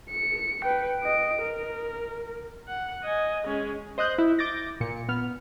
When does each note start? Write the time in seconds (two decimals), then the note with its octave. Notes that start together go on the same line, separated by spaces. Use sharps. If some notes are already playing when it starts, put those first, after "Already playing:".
0.10 C#7
0.65 B4 G5
1.00 D#5 D7
1.41 A#4
2.68 F#5
3.04 D#5 G#5
3.46 G#3 C#4
3.98 C5 D#5 D#6 F#6 G6
4.18 E4
4.39 D6 G6 A6 A#6
4.80 A#2 C#7
5.09 B3 F6